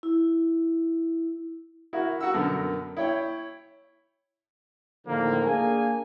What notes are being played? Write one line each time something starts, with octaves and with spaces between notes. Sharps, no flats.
E4
E4 F#4 A#4
F#4 F#5 A#5 E6
F#2 B2 D3 A4 A#4
E4 C#5 G5
A2 D3 D#3 F3 A#3
A#3 D4 G#4 F5 G#5